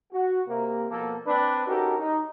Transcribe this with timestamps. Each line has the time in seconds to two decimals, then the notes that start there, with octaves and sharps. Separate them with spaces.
0.12 F#4
0.48 C3 A#3
0.90 B2 F3 A#3 A4
1.26 C4 D4 B4
1.67 C#4 D#4 F#4 G4 A4 A#4
1.98 D#4